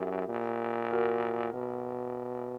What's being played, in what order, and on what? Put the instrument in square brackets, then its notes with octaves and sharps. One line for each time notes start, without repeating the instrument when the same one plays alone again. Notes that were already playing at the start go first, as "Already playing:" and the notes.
Already playing: [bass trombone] F#2 [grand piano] E4 F#4 G4
[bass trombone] A#2
[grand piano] F#4 A#4
[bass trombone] B2